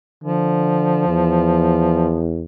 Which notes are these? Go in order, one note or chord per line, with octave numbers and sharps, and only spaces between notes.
D3 F3
E2